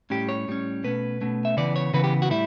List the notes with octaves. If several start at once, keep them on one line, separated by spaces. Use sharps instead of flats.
A2 G3 C#4 G4
C#5
A2 G3 C#4
B2 A3 C#4 B4
B2 A3 C#4
E5
C#3 E3 B3 D5
C#5
C#3 E3 B3 B4
G4
F#4
A2 G3 E4